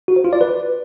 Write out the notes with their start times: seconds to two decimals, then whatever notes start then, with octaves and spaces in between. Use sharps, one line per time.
0.08 F#4
0.16 C5
0.24 F4
0.33 D5
0.41 B4